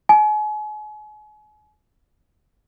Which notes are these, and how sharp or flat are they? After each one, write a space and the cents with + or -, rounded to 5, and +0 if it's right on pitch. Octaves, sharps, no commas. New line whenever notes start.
G#5 +40